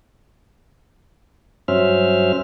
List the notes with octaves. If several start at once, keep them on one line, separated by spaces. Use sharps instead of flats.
G2 F#3 C#4 C5 E5 F6